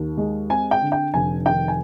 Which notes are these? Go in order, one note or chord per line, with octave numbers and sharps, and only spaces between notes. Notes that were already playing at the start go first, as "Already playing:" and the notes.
Already playing: D#2
G#3
C4 G#5
G5
D3
G5
F1 G#5
D#3 G5
G#5